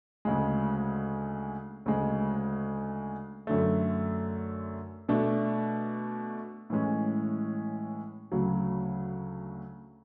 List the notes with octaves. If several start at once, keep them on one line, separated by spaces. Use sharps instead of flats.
D2 C#3 G#3
D2 C#3 G#3
F#2 D3 A3
B2 A3 D4
A2 E3 G#3 C#4
D2 C#3 F#3